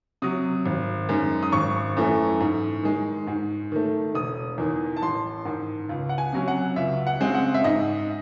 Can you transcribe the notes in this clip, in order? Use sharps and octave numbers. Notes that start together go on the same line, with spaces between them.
C3 F#3 D#6
G#1
F#2 D#3 G#3
D#6
G#1 C#6
F#2 E3 A3
G#2
D#3 G#3
G#2
D#3 A3
E1 D#6
E2 D#3
A5
A1 C6
G#2 D#3
C#2
F#5
G#5
C3 F#3 C#4
F#5
C#2 E5
F#5
C#3 G#3 C4
F#5
E5
G#2 D#5